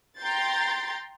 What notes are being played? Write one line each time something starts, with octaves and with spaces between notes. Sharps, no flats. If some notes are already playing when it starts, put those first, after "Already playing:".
G5 A#5 C6 G6 A6